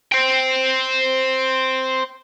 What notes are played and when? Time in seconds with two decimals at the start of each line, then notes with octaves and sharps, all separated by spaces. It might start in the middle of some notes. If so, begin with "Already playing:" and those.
0.12 C5 G5